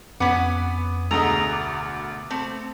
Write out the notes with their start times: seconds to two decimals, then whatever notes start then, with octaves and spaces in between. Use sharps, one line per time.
0.20 F2 B3 C#4 B4 F#5 D6
1.11 D2 B2 D3 G#4 A4 A#5 D#6 E6
1.53 D6 A6
2.30 A3 C4